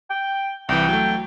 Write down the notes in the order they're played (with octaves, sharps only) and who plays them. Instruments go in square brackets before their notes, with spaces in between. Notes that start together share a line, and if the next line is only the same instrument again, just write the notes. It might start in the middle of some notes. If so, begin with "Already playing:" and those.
[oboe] G5
[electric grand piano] C2 E3 [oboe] G5
[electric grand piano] F#3 A3